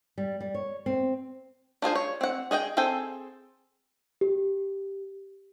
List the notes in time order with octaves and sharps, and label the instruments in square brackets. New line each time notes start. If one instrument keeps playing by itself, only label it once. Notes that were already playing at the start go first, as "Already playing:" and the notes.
[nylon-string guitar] G3
G3
C#5
C4
[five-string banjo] D4 F4 G#4 C5
C#5
C4 F#5
G#4 D#5 F#5 G5
C4 G#4 A4 G5 G#5
[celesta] G4